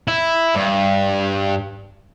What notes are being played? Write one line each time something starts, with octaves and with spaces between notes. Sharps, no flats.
E4
G2